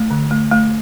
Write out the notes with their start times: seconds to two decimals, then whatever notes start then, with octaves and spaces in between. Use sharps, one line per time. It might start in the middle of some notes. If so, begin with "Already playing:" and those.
Already playing: A3
0.11 D3
0.31 A3
0.52 A3